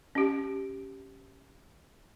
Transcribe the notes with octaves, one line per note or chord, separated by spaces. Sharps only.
C#4 G4